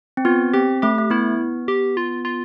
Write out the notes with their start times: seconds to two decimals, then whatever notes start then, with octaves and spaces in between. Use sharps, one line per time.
0.17 C4
0.25 B3 F4
0.53 C4 G4
0.82 A3 G4
0.98 A3
1.10 B3 E4
1.68 G4
1.97 F4
2.25 F4